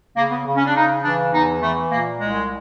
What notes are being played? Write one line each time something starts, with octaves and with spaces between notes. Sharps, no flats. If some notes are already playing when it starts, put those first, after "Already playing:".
C#3 A#3
B3
C#3
C#4
D4
C#3 D#4
E3 D4
E2 D#4
E3 A3
A#2 A#3
C2 G#3